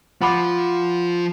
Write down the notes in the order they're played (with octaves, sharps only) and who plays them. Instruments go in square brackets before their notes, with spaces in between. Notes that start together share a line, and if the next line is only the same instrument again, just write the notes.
[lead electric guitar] F3 F4 [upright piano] F#5 B5 D6